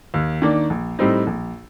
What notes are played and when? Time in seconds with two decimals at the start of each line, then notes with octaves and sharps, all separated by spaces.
0.14 D#2
0.42 D#3 A#3 D4
0.70 A#1
0.99 A2 G3 C4 D#4
1.27 A#1